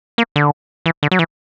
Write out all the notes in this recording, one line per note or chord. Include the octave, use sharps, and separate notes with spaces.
A#3
D3
E3
D3
F#3
E3